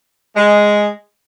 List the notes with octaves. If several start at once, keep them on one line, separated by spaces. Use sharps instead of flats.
G#3